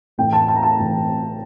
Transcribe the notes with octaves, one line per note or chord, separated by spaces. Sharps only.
A1 A2 E3 G5
A5
A5
A#5
A5
A2 E3